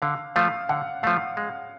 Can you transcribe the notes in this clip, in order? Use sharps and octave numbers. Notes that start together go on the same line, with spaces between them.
D3 F5
F3 A3 F5
D3 F#5
F3 A3 F5
G#3